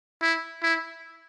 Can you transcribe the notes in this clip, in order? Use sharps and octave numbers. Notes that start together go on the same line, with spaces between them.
E4
E4